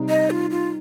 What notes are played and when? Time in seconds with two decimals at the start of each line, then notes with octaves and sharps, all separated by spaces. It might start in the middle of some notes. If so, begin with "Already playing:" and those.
Already playing: C3 G3 D#4
0.09 D#5
0.30 F4
0.50 F4